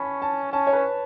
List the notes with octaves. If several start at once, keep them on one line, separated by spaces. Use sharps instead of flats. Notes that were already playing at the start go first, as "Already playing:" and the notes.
Already playing: C#4 A5 B5 C#6
A5
C#4 A5
C#5
B4